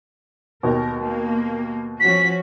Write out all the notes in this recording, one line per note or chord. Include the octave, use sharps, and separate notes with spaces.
D#2 B2 A#4
A#3
F3 C#4 F#4 B6